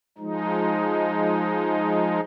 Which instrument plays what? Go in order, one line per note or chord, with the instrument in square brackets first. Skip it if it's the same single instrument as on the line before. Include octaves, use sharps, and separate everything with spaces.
[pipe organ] F3 G#3 D#4